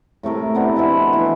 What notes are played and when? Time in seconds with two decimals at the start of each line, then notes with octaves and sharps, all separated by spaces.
0.23 A2 C3 A3 A#4
0.55 C3 B3 D4
0.76 B2 F3 E4 G#5
1.13 E3